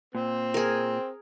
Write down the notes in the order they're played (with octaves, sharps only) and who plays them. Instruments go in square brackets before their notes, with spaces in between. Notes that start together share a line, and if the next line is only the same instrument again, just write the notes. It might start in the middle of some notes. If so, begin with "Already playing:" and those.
[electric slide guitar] A#2 [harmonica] C4
[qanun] G#4 A#4